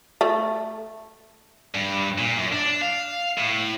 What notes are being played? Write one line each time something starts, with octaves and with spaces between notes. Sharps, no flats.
A3
G2
A#2
F#2
D4
F5
A2